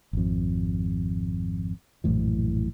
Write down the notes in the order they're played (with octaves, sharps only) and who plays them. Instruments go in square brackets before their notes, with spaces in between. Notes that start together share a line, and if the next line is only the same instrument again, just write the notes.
[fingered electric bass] G#1 F2
A#1 F#2 A2 E3